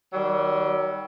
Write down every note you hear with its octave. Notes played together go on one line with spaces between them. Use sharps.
D#3 F#3 G3